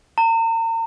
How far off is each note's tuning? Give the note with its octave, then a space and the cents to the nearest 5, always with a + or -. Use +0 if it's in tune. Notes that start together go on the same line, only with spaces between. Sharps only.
A#5 -40